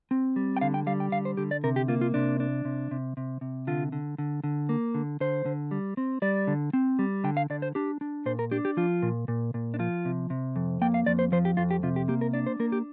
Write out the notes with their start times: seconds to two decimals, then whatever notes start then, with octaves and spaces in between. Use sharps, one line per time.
0.11 C4
0.36 G3
0.57 G5
0.61 D3 F5
0.74 G5
0.87 G3 F5
1.00 G5
1.12 D3 F5
1.25 C5
1.37 D3 G4
1.51 D5
1.64 C3 A#4
1.76 G4
1.88 A#3 F4
2.01 F4
2.14 C3 D4
2.40 D4
2.65 C3
2.91 C3
3.17 C3
3.41 C3
3.67 D3 F4
3.92 D3
4.18 D3
4.44 D3
4.69 A#3
4.94 D3
5.20 D3 C5
5.46 D3
5.71 G3
5.97 C4
6.22 G3 D5
6.47 D3
6.73 C4
6.99 G3
7.24 D3 G5
7.37 F5
7.50 D3 D5
7.62 C5
7.75 D4 G4
8.01 D4
8.26 A#2 C5
8.39 A#4
8.51 D4 G4
8.65 G4
8.77 F3 F4
9.02 A#2
9.28 A#2
9.54 A#2
9.74 D4
9.79 F3 F4
10.05 C3
10.30 C3
10.56 F2
10.81 A#3 G5
10.94 F5
11.06 F2 D5
11.19 C5
11.32 F3 C5
11.45 G4
11.57 F2 F4
11.71 G4
11.83 C3 F4
11.96 G4
12.08 A#3 G4
12.21 A#4
12.33 D4 D5
12.46 C5
12.60 A#3 A#4
12.72 G4